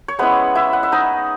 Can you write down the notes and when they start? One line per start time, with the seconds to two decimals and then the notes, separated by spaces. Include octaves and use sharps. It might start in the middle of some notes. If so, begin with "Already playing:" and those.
0.08 C#5
0.19 G#3 B3 C#4 E4 B4
0.55 E4 E5
0.73 F#5
0.83 E5
0.92 D#4 D#5